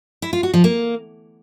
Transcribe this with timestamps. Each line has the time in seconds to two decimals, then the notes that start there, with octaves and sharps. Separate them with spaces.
0.22 E4
0.33 F4
0.43 F#4
0.54 F3
0.64 A#3